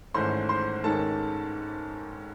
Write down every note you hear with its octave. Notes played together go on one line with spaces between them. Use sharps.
G#1 G#2 E3 A3 C#4 C5 C6
C5 C6
G#1 G#2 D#3 G#3 C#4 A4 A5